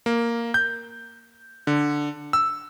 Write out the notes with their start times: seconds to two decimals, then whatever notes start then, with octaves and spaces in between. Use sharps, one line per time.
0.06 A#3
0.54 G6
1.67 D3
2.33 E6